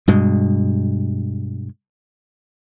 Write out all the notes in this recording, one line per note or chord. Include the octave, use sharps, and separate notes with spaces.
G2 B2 G#3